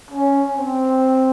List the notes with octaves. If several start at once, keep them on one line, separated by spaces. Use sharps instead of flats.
C#4
C4